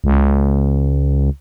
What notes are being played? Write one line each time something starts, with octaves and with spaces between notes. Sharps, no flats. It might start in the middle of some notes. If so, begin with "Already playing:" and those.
C#2